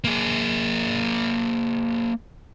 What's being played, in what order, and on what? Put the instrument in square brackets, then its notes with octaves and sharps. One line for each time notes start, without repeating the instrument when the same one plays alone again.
[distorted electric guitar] A#3 G#4